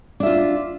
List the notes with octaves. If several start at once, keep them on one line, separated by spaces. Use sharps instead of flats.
D4 F4 E5